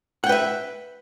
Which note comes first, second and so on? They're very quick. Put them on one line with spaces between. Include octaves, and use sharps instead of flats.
F#5 G5 B4 E5